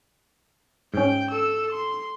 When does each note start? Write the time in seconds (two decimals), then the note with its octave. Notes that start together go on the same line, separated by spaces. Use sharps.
0.94 G#2 C#4 G5
1.30 A4 E6
1.72 C6